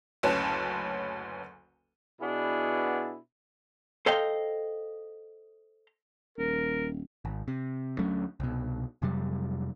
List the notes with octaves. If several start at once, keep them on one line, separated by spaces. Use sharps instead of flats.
F#1 D2 C#4 B4 A5
B2 B3 D4 E4 G#4
A4 C5 D#5 F5 G5
D#1 A#4
G#1
C3
D2 F#3 A3 C#4
C2 B2
F2 C3 F#3 G3